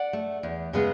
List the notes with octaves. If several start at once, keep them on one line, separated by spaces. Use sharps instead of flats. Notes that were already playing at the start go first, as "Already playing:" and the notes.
Already playing: D5 F#5
A3
E2
C#3 G#3 B3